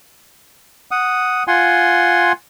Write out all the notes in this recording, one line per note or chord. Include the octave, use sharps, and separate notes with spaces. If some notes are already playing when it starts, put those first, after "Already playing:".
F#5 D#6
F4 F#5 G#5 C6